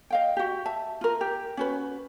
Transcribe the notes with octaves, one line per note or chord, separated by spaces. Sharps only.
D#5 F5 G5
F#4 G4
E5 A5
F4 A#4
G4
C#4 F#4 B4